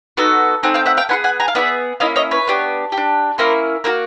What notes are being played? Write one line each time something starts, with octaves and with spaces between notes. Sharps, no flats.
B3 D#4 F#4 A4
A3 C4 D#4 F#5 G#5
F5 G5
E5 F#5
F5 G5
B3 E4 G#4 F#5 G#5
F#5 G#5
G#5 A#5
F5
B3 E4 G#4 D5 E5
A#3 C#4 E4 D#5 F5
C#5 D#5
B4 C#5
B3 D4 G4
G4
D4
A#3 C#4 E4 A#4 C5
A#3 D4 F#4 A#4